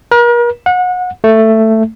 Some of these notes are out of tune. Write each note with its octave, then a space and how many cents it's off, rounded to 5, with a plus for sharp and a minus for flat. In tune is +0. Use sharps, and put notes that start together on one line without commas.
A#4 +40
F#5 -30
A3 +10